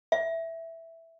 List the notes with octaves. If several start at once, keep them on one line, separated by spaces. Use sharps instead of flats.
E5